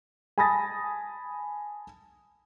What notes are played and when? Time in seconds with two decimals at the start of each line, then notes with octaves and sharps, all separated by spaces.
0.38 G#5 A5 B5 D#6 A6 A#6